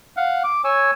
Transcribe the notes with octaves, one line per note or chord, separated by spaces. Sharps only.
F5 F#5
D6
C#5 G#5 E6